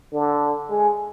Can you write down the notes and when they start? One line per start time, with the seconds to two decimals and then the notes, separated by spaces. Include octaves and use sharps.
0.13 D3
0.70 G#3